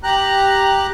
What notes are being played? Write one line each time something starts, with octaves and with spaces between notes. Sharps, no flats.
G4 A#5 F#6